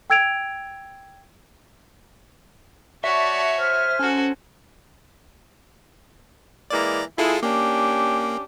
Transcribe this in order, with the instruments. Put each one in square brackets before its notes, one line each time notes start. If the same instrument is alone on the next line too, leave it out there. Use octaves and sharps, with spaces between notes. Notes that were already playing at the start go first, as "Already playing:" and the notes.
[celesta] G5 E6 G#6 D7 F7
[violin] F#4 C#5 [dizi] D5 [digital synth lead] E5 [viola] A5 C#6
[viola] C5 G#5 [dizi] F6
[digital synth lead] C#4 [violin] F#4 A4
[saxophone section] E3 G#3 A#3 [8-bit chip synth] D5 A#5
[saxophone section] G#3 E4 [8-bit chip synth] F4 G#4 A4
[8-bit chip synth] A#3 [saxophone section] C#4 D4 G4